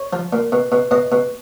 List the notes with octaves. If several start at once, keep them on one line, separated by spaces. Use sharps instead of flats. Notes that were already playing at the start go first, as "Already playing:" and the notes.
Already playing: C#5
F3
A#2
B2
B2
B2 D#5
B2